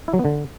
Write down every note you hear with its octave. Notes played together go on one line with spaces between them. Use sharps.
E4
F#3
B3
D3